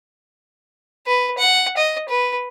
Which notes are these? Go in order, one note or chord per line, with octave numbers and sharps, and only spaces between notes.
B4
F#5
D#5
B4